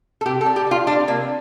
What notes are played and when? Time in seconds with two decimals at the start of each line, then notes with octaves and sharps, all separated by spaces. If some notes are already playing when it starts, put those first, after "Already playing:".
0.21 A4
0.26 C3 G4
0.41 A4
0.46 G3
0.56 G4
0.67 G3 F4
0.87 G3 D4
1.08 C3 A#3